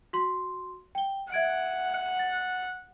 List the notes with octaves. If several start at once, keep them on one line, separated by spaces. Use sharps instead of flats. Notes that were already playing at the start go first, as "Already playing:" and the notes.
F#4 C6
G5 G7
E5 F#5 G#6 D7
A6